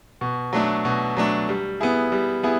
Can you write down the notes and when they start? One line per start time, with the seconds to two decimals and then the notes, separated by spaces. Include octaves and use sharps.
0.21 B2
0.53 F#3 A3 D4
0.85 B2
1.17 F#3 A3 D4
1.49 G3
1.80 B3 E4 G#4
2.12 G3
2.43 B3 E4 G#4